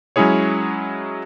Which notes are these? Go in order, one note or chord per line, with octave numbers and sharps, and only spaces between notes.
F#3 G#3 C#4 E4 G#4 C#5